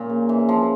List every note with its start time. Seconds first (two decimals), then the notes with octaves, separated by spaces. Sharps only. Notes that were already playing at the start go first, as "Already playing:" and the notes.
Already playing: A#2 C#4
0.09 C#3
0.29 E3
0.49 F3